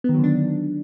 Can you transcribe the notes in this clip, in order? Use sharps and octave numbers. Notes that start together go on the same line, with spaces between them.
D3 D#3 F#3 B3 D4